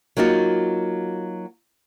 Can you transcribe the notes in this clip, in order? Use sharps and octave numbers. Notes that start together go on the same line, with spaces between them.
F#3 A#3 D#4 F4 F#4